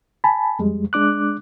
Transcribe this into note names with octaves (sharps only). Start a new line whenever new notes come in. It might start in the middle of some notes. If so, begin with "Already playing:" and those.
G#5 A5 B5
F2 G3 G#3
G#3 D4 D6 F#6